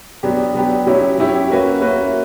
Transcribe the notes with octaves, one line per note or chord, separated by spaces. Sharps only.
F#3 B3 D4 G4
F#3 B3 D4 G4
F#3 C#4 E4 G4 C#5
F#3 C#4 E4 G4 C#5
A#3 C#4 F#4 B4 E5
A#3 C#4 F#4 B4 E5